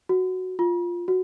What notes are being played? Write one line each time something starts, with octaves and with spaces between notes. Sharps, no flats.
F#4
F4
F#4